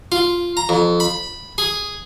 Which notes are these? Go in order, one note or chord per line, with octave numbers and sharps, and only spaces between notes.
F4
A#5
F2
B5
G#4